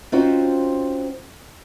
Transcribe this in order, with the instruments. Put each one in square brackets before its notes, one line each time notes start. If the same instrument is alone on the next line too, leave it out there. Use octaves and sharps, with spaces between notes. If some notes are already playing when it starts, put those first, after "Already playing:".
[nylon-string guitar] C4 C#4 D#4 F4 F#4 C5